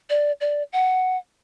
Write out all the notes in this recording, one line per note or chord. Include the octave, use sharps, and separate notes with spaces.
D5
D5
F#5